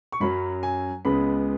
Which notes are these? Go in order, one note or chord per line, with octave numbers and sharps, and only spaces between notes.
C#6
F#2 F#3 C#4 B5
G#5
C#2 C#3 G#3 B3 B5